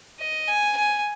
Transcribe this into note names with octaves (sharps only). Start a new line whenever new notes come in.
D#5
G#5
G#5